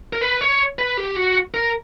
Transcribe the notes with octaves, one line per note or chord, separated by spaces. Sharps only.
A#4
B4
C#5
B4
G4
F#4
A#4